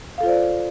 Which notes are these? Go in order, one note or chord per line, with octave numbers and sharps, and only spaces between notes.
F4 A4 C5 D5 F5